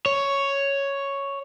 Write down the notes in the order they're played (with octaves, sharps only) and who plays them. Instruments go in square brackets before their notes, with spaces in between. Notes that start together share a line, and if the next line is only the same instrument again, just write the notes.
[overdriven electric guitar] C#5